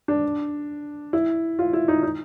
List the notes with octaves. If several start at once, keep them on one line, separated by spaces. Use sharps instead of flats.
D4
E4
F4
E4
D#4
D#4